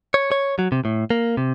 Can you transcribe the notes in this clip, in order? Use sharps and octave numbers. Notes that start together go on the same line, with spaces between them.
C#5
C#5
F#3
C3
A2
A#3
C3